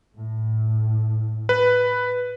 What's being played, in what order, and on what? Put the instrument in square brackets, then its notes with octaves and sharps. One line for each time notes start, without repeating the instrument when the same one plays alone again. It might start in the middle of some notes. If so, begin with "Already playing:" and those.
[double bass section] A2
[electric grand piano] B4